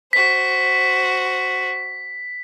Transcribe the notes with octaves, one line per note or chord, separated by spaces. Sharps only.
F#4 C5 B6